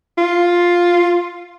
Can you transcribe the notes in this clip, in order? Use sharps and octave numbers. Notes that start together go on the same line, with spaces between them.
F4